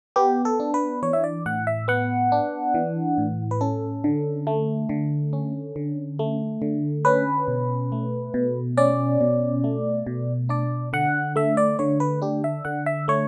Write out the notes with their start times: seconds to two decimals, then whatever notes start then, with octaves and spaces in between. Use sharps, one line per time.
0.16 B3 G4
0.45 A4
0.60 D4
0.74 B4
1.03 E3 C#5
1.13 E5
1.24 D5
1.46 A2 F#5
1.67 E5
1.88 B3 F#5
2.32 D4
2.74 E3
3.18 A2
3.51 B4
3.61 C#4 A4
4.04 D3
4.47 A3
4.89 D3
5.33 C#4
5.76 D3
6.19 A3
6.62 D3
7.05 C#4 B4
7.48 B2
7.92 A3
8.34 B2
8.77 C#4 D5
9.21 B2
9.64 A3
10.07 B2
10.49 D4 D5
10.93 D3 F#5
11.36 A3 E5
11.57 D5
11.79 D3 C#5
12.00 B4
12.22 D4 G4
12.44 E5
12.65 D3 F#5
12.86 E5
13.08 A3 C#5